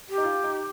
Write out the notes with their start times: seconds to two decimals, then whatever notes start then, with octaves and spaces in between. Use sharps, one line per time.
0.09 G4
0.18 D#4
0.24 F4
0.44 D#4